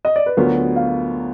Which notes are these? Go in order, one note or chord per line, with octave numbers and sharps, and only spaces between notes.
D#5
D5
B4
D2 D3 F#3 B3 F4 A#4
F5